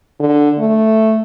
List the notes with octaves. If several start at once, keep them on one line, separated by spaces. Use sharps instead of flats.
D3
A3